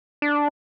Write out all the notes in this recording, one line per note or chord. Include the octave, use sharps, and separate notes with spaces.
D4